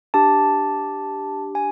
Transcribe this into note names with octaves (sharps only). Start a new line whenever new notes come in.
D4 G4 A5
G#5